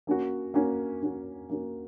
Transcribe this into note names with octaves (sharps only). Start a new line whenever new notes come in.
A#3 C#4 F#4
A#3 C#4 F#4
A#3 C#4 F#4
A#3 C#4 F#4